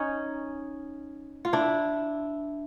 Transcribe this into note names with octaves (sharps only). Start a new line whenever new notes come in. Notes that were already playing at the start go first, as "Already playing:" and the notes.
Already playing: C#4 D#4
F4
D4 E4